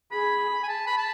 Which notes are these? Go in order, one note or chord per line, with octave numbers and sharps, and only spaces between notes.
G#4 B5
G#5
A5
B5
A5